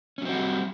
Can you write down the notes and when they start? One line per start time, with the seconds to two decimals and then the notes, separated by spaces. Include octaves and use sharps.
0.18 C#4
0.22 F#3
0.25 C4
0.29 F#4
0.33 G3